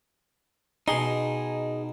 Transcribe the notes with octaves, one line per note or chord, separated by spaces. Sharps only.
B2 D#4 G#4 C6